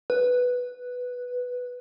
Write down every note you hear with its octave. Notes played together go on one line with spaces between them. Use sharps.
B4